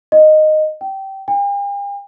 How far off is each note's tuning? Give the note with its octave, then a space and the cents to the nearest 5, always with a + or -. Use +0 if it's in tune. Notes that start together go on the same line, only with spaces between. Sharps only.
D#5 -10
G5 -20
G5 +45